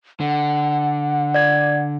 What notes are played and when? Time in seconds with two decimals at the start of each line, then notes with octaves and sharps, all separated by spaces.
0.20 D3 F#5
1.34 D5 G#6